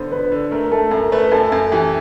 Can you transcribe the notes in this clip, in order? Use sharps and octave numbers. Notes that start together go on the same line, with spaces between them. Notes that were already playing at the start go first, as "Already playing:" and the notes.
Already playing: D3 B3 C5
D3 B4
D3
A3 A#4
A3 A4
F#2 A#4
A3 B4
F#2 A4
F#2
E3 G4